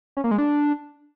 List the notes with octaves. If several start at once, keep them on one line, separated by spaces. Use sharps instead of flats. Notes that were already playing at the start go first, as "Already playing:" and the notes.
C#4
A#3
G#3
D4